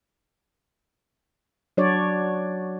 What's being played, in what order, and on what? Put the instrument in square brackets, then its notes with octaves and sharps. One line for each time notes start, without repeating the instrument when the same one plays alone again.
[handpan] F#3 D4 F#4 C#5 D5